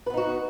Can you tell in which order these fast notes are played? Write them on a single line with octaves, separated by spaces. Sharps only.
B4 B3 D#4 F#4